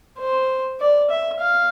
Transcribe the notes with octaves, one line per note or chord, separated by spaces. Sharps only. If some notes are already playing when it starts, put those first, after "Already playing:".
C5
D5
E5
F5